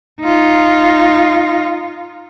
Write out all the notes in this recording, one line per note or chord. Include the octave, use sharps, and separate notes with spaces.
D#4 F4